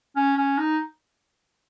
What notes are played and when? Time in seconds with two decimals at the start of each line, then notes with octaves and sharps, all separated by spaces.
0.16 C#4
0.37 C#4
0.58 D#4